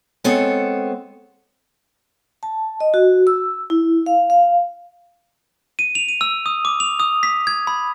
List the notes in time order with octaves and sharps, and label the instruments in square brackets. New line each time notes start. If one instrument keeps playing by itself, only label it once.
[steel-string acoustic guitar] G#3 B3 C4 A4 C#5
[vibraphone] A5
D#5
F#4
E6
E4
F5
F5
[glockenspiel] D#7
F7
D#7
E6
D#6
D6
F7
D#6
B6
G#6
B5